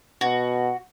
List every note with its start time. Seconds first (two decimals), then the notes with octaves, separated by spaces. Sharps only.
0.21 B2 F#4